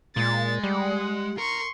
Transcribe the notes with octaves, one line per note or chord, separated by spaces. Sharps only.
A#2 G#3 A6
G3 F#5
A#4 C6 C#6